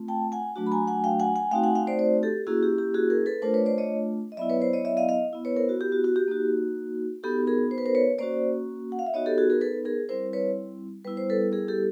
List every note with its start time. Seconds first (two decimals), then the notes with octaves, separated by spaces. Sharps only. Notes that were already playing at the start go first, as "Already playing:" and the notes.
Already playing: A3 C4 F4
0.08 G5 A5
0.32 F#5 G#5
0.56 F#3 A3 D4 F#4
0.67 B5
0.72 G#5 A#5
0.88 F#5 G#5
1.04 F5 G5
1.20 F#5 G#5
1.36 F#5 G#5
1.51 A3 C4 D#4 F#4 F5 G5
1.63 F#5 G#5
1.75 F5 G5
1.87 C5 D5
1.99 C5 D5
2.23 G4 A4
2.47 A#3 C#4 E4 F#4 G#4
2.63 G4
2.78 G4
2.94 F#4 G#4
3.10 G#4 A#4
3.26 A4 B4
3.42 A3 D4 F4 A#4 C5
3.54 B4 C#5
3.66 C5 D5
3.78 C#5 D#5
4.32 D#5
4.37 F#3 B3 E4 D5 E5
4.49 B4 C#5
4.61 C5 D5
4.73 C#5 D#5
4.85 D5 E5
4.97 D#5 F5
5.09 D#5 F5
5.33 B3 E4
5.45 B4 C#5
5.56 A#4 C5
5.69 F#4
5.81 G4
5.92 F#4
6.04 F#4
6.16 G4
6.28 A#3 D#4 F#4
7.23 B3 D#4 F#4 G4 A4
7.47 G#4 A#4
7.71 C5
7.78 B4
7.86 A#4 C5
7.95 B4 C#5
8.19 A#3 C#4 F#4 C5 D5
8.92 F#5
8.99 F5
9.07 E5
9.14 B3 D#4 F#4 C#5 D#5
9.26 G4 A4
9.38 F#4 G#4
9.50 G#4 A#4
9.61 A4 B4
9.85 G#4 A#4
10.09 G3 C4 E4 A#4 C5
10.33 B4 C#5
11.04 G3 B3 E4 B4
11.17 C5
11.30 A4 B4
11.52 G#4 A#4
11.68 G4 A4